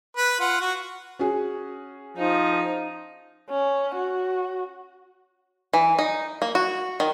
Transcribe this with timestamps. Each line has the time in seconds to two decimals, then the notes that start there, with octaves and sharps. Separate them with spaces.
0.17 B4 B5
0.40 F4 F#5
0.60 F#4
1.19 C#4 F#4 G#4
2.17 F3 D#4
3.50 C#4
3.96 F#4
5.73 E3
5.99 D#4
6.42 A#3
6.55 F#4
7.00 D#3